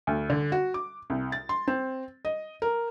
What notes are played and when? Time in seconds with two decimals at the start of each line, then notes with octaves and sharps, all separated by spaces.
0.07 D2
0.30 D3
0.52 F#4
0.74 D6
1.10 C2
1.32 A6
1.49 C6
1.68 C4
2.25 D#5
2.62 A#4